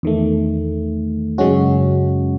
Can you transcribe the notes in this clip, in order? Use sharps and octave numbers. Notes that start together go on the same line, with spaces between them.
E2 D#3 A3
F#2 C#3 G#3 C#4 F#4